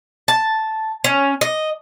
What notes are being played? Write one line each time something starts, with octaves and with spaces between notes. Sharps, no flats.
A5
C#4
D#5